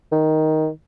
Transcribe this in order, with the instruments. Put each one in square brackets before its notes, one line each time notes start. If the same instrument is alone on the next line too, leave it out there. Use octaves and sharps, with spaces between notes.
[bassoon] D#3